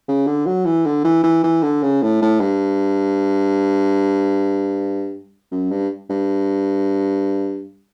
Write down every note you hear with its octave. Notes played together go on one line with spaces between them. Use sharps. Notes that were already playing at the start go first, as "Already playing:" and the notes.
C#3
D3
F#3
E3
D3
E3
E3
E3
D3
C#3
A2
A2
G2
F#2
G2
G2